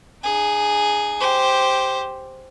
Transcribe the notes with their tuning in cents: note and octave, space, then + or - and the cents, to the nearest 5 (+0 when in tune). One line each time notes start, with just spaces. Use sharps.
D#4 -40 G#4 +0
G4 -5 C5 +0